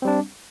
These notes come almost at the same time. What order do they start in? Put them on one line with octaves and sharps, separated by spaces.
C4 G3 D4